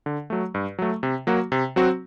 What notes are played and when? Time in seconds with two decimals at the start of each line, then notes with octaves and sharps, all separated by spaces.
0.06 D3
0.30 F#3 A3
0.54 G2
0.79 F#3 A3
1.03 C3
1.27 F#3 A#3 F#4
1.52 C3
1.76 F#3 C4 F#4